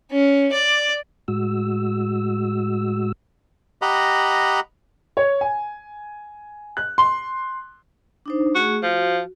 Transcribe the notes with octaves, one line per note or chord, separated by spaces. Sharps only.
C#4
D5
A2 G#3 F#4 E6
G4 D#5 F#5 A#5 B5
C#5
G#5
F#6
C6
D4 D#4 C5
A3 F#4 G#4
F3 F#4